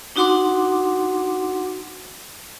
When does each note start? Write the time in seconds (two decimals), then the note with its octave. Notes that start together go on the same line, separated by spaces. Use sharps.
0.16 D4 D#4 F#4 F#5 C6 D6